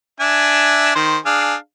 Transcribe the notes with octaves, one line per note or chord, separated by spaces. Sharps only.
D4 E5 G#5
D#3 C5
D4 G#4 F5